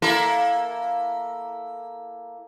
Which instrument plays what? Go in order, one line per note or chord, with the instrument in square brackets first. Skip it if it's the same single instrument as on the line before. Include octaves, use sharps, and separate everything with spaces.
[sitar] A#3 E4 A4